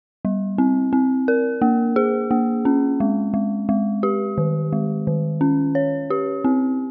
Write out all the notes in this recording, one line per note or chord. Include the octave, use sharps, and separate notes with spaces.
G3
C4
C4
A#4
A#3
G#4
A#3
C#4
G#3
G#3
G#3
G4
D#3
G#3
D#3
C#4
C#5
G4
C4